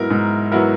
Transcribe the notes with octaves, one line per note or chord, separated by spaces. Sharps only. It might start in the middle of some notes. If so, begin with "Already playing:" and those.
Already playing: G#2 F#3 B3 E4 A#4
G#2
F#3 B3 E4 A#4